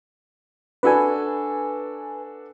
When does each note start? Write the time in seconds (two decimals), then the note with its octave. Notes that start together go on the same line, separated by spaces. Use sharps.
0.83 D4 F#4 A4 B4 G#5